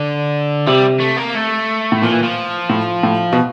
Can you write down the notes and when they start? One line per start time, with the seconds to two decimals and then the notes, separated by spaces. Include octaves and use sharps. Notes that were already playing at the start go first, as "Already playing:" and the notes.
Already playing: D3
0.67 C3 G3
1.00 A3
1.17 A#3
1.35 A3
1.92 A2
2.02 A#2 F3
2.12 E3
2.22 F3
2.70 A2
3.03 A2
3.32 B2